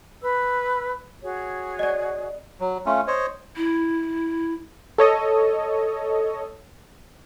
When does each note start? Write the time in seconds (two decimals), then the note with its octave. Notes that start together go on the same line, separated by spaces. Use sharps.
0.21 B4 E6
1.22 F#4 G#4 C#5
1.79 D5 D#5
2.60 F#3
2.86 A3 C#4 F4
3.07 C5 C#5 D#5
3.56 E4
4.98 A4 C#5 D#5